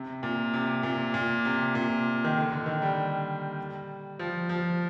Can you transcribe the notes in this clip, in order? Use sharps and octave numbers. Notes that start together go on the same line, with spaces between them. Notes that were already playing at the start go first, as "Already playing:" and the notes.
Already playing: C3
A#2
C3
A#2
A#2
C3
A#2
D#3
D3
D3
D#3
G3
F3
F3